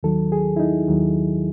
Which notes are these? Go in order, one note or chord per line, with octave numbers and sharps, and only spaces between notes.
D#2 D#3 F#3 A4
G#4
E4
D#4
D#2 D#3 F#3